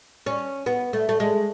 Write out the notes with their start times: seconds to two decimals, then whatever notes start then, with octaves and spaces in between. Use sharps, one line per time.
0.26 C#4
0.66 B3
0.93 A3
1.09 A3
1.20 G#3